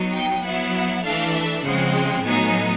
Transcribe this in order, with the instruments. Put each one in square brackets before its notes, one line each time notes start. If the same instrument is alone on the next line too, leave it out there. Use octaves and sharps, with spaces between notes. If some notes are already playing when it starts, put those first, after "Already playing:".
Already playing: [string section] F#3 B3 D#4
G5
F#3 B3 E4 F#5
E3 A3 D4 F5
E5
C#3 F3 G#3 C4 F#5
G5
A2 F#3 B3 D#4 G#5